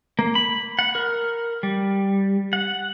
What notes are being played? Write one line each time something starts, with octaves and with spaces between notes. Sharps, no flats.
A#3
B5
F#5
A#4
G3
F#5